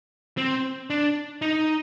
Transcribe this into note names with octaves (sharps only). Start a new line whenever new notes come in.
C4
D4
D#4